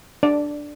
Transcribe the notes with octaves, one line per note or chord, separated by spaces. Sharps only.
D4 D5